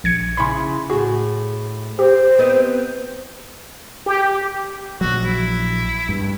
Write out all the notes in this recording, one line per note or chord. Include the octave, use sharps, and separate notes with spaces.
A#1 G#6 C#7
C#3 E4 C#5 B5 C6
A2 F#4 G#4
G4 C5
B3 C4 D#5
G4
A#1 F#3 F#4
E4
G2